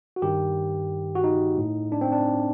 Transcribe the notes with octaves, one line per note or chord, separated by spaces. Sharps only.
F#4
G2 D#3 G4
F#4
D#4
A2
D4
C4
D4